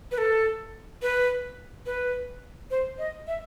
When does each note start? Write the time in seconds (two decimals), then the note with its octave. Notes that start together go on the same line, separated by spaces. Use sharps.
0.12 B4
0.18 A4
1.02 B4
1.86 B4
2.71 C5
2.99 D#5
3.27 E5